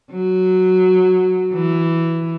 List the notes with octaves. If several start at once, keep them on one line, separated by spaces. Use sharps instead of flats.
F#3
E3